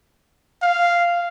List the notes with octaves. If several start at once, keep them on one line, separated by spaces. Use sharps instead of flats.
F5